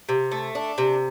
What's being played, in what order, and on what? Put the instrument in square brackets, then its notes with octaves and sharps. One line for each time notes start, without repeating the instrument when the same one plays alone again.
[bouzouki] C3
A3
D4
C3